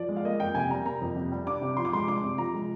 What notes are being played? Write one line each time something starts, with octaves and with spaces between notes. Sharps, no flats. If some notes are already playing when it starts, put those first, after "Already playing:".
Already playing: F3 D5
G#3
F5
A#3 D#5
F2 G5
C3 G#5
G3 A#5
A#3 A#5
F2
C3
G3
D4 D6
C3
F3 C6
D6
G#3 C6
D4 D6
C3
F3 A#5
G#3